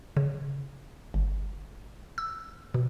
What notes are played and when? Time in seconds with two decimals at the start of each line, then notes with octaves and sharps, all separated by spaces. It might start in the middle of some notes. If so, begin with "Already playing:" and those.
0.17 C#3
1.14 G1
2.18 E6
2.74 B2